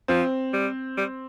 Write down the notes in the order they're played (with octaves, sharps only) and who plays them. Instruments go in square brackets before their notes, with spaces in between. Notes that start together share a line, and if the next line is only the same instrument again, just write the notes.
[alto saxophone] F3 [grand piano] C4
[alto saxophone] G3
G3